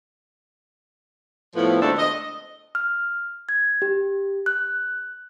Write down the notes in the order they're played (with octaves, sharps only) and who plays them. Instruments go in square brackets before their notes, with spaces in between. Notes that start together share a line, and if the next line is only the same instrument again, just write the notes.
[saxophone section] A2 F3 B3
D2 G#3 A3 C4 D4 A4
D#5
[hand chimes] F6
G#6
G4
F#6